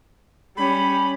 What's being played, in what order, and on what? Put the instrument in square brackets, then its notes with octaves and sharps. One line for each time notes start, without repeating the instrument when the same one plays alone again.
[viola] G3 C#4 [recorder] B5